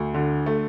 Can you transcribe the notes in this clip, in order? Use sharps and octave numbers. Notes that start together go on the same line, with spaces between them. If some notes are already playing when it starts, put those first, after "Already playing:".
Already playing: D2
D3
A3